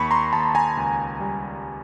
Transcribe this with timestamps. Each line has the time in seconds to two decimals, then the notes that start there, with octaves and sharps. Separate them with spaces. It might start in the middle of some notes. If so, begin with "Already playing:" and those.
Already playing: D#2 B5 C#6
0.11 A#5 C6
0.33 D#2 A5 B5
0.55 G#5 A#5
0.77 C#2
1.21 G3